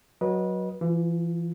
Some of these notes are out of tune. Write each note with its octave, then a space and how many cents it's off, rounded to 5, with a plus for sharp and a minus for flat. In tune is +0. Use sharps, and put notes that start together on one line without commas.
F#3 +0 B4 -30 D#5 +0
E3 +30 F4 +0